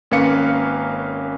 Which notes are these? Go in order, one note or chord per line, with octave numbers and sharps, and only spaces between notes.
G#1 A#3 C#4 B4 F5 C#7